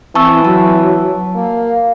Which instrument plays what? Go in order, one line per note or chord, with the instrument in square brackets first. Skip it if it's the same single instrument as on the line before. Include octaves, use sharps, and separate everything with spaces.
[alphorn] E3 [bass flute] C4 [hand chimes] A5 C#6 E6
[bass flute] F#3 [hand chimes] A5
[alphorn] A#3 [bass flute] F5